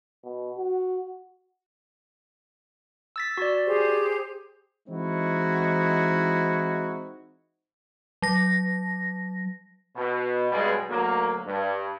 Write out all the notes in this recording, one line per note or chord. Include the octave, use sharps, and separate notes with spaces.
B2
F#4
E6 A6 B6
F#4 D5
G4 G#4 C5
E3 G#3 C4 D#4 E4 F#4
F#3 A#6
B2
B1 G2 B2 G3 G#3 G#4
D2 F#3 A#3
G2